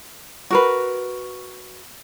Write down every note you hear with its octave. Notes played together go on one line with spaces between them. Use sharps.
F#4 A#4 B4